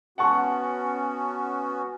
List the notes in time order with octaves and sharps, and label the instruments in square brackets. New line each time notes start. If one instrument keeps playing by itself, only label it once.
[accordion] B3 C#4 F#4 [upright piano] F#5 A5 C#6